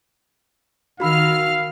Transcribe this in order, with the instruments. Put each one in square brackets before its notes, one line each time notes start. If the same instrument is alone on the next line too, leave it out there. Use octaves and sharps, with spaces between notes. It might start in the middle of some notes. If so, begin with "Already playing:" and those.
[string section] D#3 F6 [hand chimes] F#4 B5 E6 [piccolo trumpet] F5